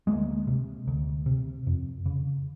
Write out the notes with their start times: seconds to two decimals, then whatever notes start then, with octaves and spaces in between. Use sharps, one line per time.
0.07 D2 G#3 A#3
0.47 C3
0.88 D2
1.26 C3
1.67 F2
2.06 C#3